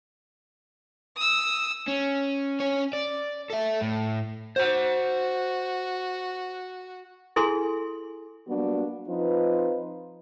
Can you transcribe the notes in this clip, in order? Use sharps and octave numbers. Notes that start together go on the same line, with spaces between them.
D#6 E6
C#4
C#4 C#5
D5
A4 E5
A2
F#4 C5 F#5
E4 G#4 A4 G#5 C6
F#3 G3 A#3 B3 D4 F#4
F3 C4 D#4 F4 B4